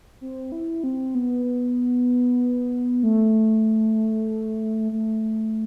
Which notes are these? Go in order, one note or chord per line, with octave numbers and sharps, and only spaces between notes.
C4
E4
C4
B3
A3
A3